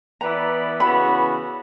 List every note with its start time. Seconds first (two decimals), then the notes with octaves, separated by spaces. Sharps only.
0.21 E3 B3 E4 B4 D5 A#5
0.80 C#3 E3 B3 F#4 B5